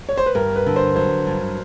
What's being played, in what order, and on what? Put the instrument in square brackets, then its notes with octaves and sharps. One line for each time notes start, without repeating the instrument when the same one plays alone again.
[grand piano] C#5
C5
B4
[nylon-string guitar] G2 [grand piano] A#4
[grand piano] B4
[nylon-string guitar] D3
[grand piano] C5
[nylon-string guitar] F#3 [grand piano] C5
[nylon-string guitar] G2